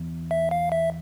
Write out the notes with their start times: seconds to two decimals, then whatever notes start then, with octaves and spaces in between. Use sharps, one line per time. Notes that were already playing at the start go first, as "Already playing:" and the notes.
Already playing: E2
0.31 E5
0.51 F5
0.72 E5